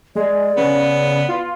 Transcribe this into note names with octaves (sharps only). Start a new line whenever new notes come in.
G#3 D5
C#3 B3
F4